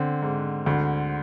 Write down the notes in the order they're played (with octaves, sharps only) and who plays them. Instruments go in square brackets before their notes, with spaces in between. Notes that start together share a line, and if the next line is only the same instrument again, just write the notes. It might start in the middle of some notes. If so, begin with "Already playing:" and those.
Already playing: [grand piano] D3 [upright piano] C4
[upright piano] G#2
[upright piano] D2 [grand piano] D3